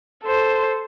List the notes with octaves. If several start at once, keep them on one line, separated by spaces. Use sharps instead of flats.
A4 C5